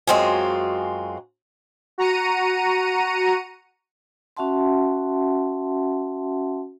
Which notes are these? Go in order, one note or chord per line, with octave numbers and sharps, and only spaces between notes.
F#2 G#3 C4 F4 F#4 G#5
F#4 A#5 C#7 D#7
C#4 F#4 E5 F#5 A5 C6